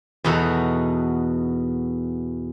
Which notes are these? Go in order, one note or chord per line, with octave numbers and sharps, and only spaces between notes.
E2 B2 D#4 F#4 A4 A#4